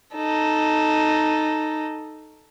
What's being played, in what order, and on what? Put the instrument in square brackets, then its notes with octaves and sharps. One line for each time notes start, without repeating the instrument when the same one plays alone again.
[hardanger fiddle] D#4 A4